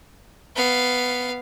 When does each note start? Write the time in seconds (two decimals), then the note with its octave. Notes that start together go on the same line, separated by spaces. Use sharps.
0.55 B3 F5